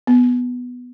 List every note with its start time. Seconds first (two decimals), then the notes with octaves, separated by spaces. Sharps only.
0.07 B3